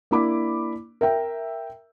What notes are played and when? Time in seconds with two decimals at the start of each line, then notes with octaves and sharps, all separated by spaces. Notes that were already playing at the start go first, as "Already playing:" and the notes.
0.11 A#3 D4 E4 B5 D6
1.01 A#4 E5 G5